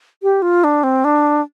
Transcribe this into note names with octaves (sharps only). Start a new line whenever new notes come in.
G4
F4
D4
C4
D4